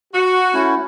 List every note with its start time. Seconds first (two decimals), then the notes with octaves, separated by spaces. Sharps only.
0.13 F#4
0.54 A3 C#4 E4